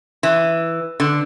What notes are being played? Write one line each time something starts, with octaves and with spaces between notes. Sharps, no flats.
E3
D3